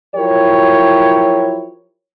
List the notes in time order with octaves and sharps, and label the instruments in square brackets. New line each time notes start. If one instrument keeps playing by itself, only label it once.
[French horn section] F3 F#3 E4 G4 A#4 C#5